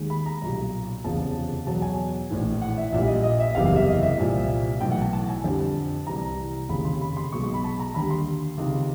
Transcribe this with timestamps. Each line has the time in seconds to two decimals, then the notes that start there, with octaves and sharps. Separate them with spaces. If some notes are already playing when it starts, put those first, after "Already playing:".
Already playing: D#2 D#3 G#3
0.10 B5
0.26 A#5
0.42 B1 A#2 G3
1.04 F1 E2 C#3 F3 A5
1.67 E2 B2 F#3 A5
1.82 G#5
2.30 A#1 A2 E3
2.62 F#5
2.77 E5
2.92 A#1 A#2 G3 E5
3.08 D#5
3.24 D#5
3.40 E5
3.55 F#1 E2 C3 E3 G3 F5
3.66 F5
3.76 E5
3.87 D#5
4.03 E5
4.18 C2 A#2 F3
4.80 B1 A2 E3 G5
4.91 F#5
5.01 A5
5.13 A5
5.29 G#5
5.44 F2 D3 G3 A5
6.07 C2 C3 E3 A#5
6.69 F1 D#2 C#3 B5
6.85 C6
7.01 B5
7.17 C6
7.32 B1 B2 G#3 C#6
7.43 C#6
7.54 B5
7.64 A5
7.80 A#5
7.94 D#2 D3 G3 B5
8.10 C6
8.57 C#2 C3 D#3